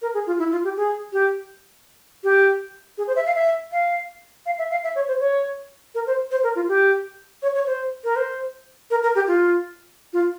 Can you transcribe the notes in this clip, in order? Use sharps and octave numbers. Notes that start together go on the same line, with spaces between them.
A#4
G#4
F4
E4
F4
G4
G#4
G4
G4
G#4
C5
E5
F5
E5
F5
F5
E5
F5
E5
C#5
C5
C#5
A#4
C5
C5
A#4
F4
G4
C#5
C#5
C5
A#4
C5
A#4
A#4
G4
F4
F4